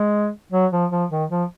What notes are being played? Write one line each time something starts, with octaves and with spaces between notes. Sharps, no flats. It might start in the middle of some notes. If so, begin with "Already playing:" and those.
Already playing: G#3
F#3
F3
F3
D#3
F3